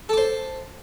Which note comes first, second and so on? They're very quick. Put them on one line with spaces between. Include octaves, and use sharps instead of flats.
A4 D6 C5